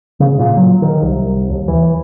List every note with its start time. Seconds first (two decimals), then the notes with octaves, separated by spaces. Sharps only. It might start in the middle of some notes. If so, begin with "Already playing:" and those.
0.20 C#3
0.39 A#2
0.57 F#3
0.82 D#3
1.02 C2
1.50 D#2
1.68 E3